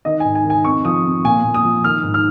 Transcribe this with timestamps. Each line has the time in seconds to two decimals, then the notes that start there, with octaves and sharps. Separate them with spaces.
0.05 D#3 D#5
0.20 G#2 G#5
0.35 G#5
0.45 D#3
0.50 G#5
0.65 F2 C#6
0.85 F3 D#6
1.05 F2
1.24 A#2 G#5
1.44 A#2
1.54 D#6
1.65 F3
1.84 D#3 F6
2.04 G#2
2.14 F6